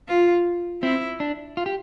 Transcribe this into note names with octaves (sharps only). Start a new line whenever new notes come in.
F4
C4 E4
D4
F4
G4